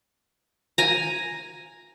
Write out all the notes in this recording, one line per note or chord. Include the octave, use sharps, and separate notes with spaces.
G#5 A#5